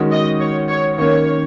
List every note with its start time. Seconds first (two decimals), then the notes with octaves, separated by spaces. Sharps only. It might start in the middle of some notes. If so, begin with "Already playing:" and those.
Already playing: D#3 G#3 C#4 F#4
0.12 D#5
0.40 C#5
0.69 C#5
0.98 D#3 A#3 C#4 C#5